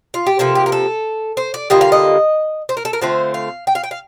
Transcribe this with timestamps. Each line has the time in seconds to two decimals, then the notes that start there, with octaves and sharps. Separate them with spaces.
0.14 F4
0.27 G4
0.39 C3 F3 A#3 A4
0.55 G4
0.66 A#4
0.72 A4
1.37 C5
1.54 D5
1.70 D3 G3 A#3 F4 D#5
1.81 F5
1.92 D#5
2.69 C5
2.77 A#4
2.85 A4
2.93 A#4
3.01 D3 A3 C4 F4 C5
3.34 F5
3.67 G5
3.75 F5
3.84 G5
3.91 F5